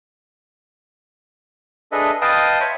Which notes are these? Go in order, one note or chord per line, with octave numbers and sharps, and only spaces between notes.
D4 G#4 A4 B4 D#5 E5
B4 D#5 F5 G5 A5 D#6
C5 C#5 E5 B5 C#6